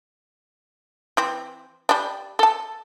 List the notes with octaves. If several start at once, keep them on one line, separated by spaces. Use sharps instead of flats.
E3 C4
G3 D4
A4 A5